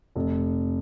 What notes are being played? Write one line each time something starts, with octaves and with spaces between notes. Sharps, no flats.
F1